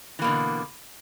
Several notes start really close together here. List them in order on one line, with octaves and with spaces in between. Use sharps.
E3 A#3 B2 D3